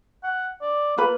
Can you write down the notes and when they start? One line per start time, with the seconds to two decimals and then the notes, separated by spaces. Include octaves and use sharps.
0.24 F#5
0.62 D5
0.98 A#3 F4 B4 B5